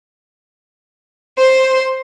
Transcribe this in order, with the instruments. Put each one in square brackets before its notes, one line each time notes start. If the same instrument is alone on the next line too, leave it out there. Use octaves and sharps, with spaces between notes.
[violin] C5 C6